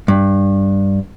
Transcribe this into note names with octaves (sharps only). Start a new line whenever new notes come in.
G2